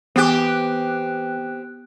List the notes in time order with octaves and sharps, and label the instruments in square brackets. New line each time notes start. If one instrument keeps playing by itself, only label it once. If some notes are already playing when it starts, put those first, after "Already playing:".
[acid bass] E3 [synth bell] B3 F#6 [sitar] C4 G4